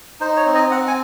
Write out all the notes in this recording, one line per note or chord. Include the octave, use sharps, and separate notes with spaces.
D#4 C5
C#5
C4
D#5
C4 F#5
G#5